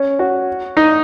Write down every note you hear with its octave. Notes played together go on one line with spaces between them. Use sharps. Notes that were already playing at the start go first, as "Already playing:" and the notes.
Already playing: C#4
F#4
D#4